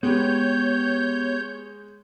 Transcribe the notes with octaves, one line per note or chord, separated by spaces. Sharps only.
G#3 B3 G4 B4 C#5 G6